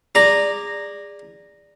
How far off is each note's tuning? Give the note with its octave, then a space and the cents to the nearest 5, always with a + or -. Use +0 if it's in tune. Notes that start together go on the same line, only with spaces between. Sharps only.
G#4 -25 D5 +0 A#5 -5